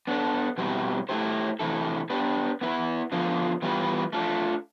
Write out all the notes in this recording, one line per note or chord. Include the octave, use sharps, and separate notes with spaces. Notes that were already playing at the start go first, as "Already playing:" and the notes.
B3 D4 A4
B2 G3 C4 E4
A3 E4 G4 C5
C3 E3 A3 E4 A4
B3 D4 G4 B4
B3 E4 B4
D3 F3 B3 F4
E3 G3 B3 F4 B4
A3 D4 F4